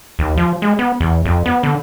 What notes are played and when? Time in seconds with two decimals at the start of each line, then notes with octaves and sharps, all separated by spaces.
0.19 D#2
0.37 F3
0.62 G#3
0.79 B3
1.00 E2
1.26 F2
1.46 B3
1.63 D3